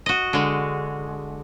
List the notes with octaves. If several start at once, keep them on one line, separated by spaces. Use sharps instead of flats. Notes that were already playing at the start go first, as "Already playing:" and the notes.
F#4 D#5
D3 G#3